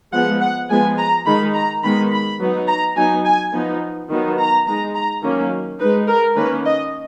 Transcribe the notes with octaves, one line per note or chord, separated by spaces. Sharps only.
F3 G#3 B3 F#5
F#5
F3 G#3 B3 G#5
A#5
D#3 G#3 D#4 B5
A#5
D#3 G#3 B3 B5
B5
F#3 B3 D#4
A#5
F#3 B3 D#4 G#5
G#5
F3 B3 D#4
D#3 F#3 B3 D#4
A#5
G#3 D#4 A#5
A#5
D#3 F#3 A#3 C#4
G#3 D#4 B4
A#4
D#3 A#3 C#4 B4
D#5